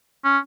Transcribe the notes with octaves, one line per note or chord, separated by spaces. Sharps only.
C#4